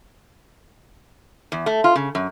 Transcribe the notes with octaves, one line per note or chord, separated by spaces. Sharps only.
E2
A3
F4
C#3
F#2